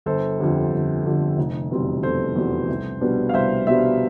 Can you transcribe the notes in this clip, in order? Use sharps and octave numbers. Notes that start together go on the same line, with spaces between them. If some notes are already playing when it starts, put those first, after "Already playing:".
G1 A4 C5
F2 D3 G3
G1
F2 D3 G3
F1
E2 B2 G3 C4
F1 A4 C5
E2 B2 G3 C4
C2
B2 G3 B3 D4
F5
C2 C5 E5
B2 G3 B3 D4 C5 E5